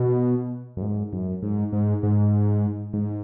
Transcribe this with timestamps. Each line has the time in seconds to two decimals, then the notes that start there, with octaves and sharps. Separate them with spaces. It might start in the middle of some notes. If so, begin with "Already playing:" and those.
Already playing: B2
0.77 F#2
0.82 G#2
1.13 F#2
1.43 G#2
1.73 G#2
2.03 G#2
2.93 G#2